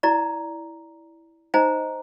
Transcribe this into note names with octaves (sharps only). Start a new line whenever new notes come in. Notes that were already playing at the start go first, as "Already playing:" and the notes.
E4 D5 A#5
D#4 C5 D#5 G#5 A#5